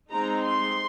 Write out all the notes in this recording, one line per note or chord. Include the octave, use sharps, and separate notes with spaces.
G#3 C4 D#4 A#5
C6